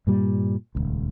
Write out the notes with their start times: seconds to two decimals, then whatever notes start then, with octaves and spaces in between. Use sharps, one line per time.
0.07 G2 A#2 G3
0.75 D#1 G#1 C#2